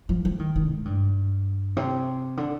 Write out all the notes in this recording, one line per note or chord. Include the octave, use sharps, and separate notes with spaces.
F3
F3
D#3
D#3
G#2
G2
C3
D3